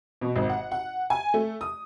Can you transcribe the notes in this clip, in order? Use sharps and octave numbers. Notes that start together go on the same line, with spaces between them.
B2
G#1
F#5
F#5
G#5
A3
D#6